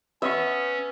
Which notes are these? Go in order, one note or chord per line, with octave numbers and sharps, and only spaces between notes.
B3 C#4 E5 C#6